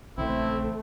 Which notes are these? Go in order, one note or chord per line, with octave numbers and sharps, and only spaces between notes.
A#1 C#3 E3 A3 C4 E4